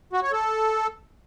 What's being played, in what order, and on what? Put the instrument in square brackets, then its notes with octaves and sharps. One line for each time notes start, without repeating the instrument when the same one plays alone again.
[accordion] F#4
C#5
A4